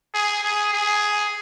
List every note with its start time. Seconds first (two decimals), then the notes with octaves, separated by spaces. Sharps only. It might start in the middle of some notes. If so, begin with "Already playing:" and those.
0.14 G#4
0.44 G#4
0.74 G#4